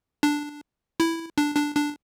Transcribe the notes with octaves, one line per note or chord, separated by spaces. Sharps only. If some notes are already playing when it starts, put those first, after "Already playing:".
D4
E4
D4
D4
D4